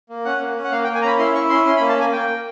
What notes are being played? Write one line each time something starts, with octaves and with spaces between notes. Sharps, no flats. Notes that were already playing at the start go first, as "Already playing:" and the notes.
A#3
C#4 F#5
A#3
C#4
F#5
A#3 F5
G5
A#3
G#5
C#4 A#5 B5
E4 C6
E4 C#6
C#4 C6
C#4 C6
B5
A#3
A5
A#3 G#5
A#3 G5
A#3